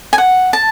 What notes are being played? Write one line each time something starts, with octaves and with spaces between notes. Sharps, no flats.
G#5
F#5
A5